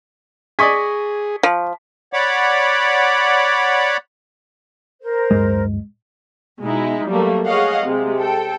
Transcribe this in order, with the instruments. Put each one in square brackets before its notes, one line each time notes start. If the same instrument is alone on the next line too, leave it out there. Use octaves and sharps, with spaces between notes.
[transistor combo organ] G#4 [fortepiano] D5 D#5 G#5 [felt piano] C#6 B6
[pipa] F3
[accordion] C#5 D5 F#5 B5 D6
[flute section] A#4 C5
[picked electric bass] D1 G2 G#3
[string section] B2 G#3 D#4 E4
F#3 G3 A3 A#3
G#4 C#5 D#5 F5 F#5
C3 G#3
A4 G5